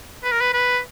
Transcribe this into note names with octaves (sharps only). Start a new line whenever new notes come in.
B4
A#4
B4
B4